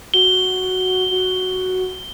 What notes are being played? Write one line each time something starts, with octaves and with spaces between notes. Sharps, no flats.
F#4 G7
F#4